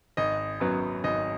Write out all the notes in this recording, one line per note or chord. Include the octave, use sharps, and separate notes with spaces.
G#1 D#5
F#2 F#3 B3
G#1 D#5